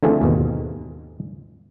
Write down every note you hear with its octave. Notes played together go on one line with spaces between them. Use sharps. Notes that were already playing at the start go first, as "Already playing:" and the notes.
D3 E3 A3 C4 F4 G#4
D#2 G#2 B2